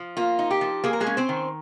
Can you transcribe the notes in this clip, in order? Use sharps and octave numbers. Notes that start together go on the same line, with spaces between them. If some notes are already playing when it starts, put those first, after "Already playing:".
Already playing: F3
A#3 F4
D#4
G4
F3
A#3 G#4
A#4
G#3 G#4
C#4
C4 C5
D#3